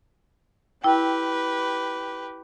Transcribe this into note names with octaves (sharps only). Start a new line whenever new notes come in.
E4 G4 B4 G5